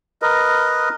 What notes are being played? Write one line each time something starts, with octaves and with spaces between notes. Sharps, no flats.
A#4 B4 D#5